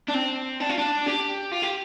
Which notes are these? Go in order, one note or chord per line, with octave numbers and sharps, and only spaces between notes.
D4
C4
D4
F4
D4
G4
F4
G4